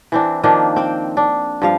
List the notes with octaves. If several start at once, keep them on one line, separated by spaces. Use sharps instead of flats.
E3 C4 D4
D#3 F3 A#3 D4
C4 G5
D4
G2 F3 F5